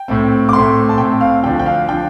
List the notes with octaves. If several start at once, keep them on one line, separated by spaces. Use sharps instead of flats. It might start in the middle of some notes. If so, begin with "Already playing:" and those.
Already playing: G5
A2 A3 C4
D6
A2 A3 C4 C6
A5
A2 A3 C4 G5
F5
D2 D3 F3 D4 G5
G5
F5
D3 F3 D4 G5